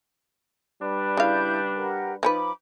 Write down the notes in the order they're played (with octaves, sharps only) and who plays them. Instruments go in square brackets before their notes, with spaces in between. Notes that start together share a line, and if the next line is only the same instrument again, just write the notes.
[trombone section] G3 D4 B4
[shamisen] C#3 F5 [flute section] E4 G6
[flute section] G4 A#4 F#5
[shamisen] F3 A4 B4 [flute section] D#4 B5 D6